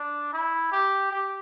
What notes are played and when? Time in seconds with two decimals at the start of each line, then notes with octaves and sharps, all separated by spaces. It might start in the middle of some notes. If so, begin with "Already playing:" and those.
Already playing: D4
0.33 E4
0.72 G4
1.11 G4